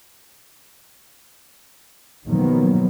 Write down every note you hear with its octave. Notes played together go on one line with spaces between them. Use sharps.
B2 D#3 F3 F#3 A#3 B3